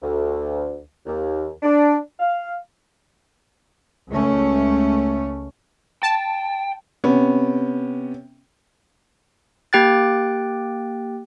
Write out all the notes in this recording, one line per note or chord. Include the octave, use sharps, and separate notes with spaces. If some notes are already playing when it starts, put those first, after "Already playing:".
D2
D#2
D4
F5
C#2 A3 C#4
G5 A5
C3 B3 C#4
A#3 G4 G5 F#6 A6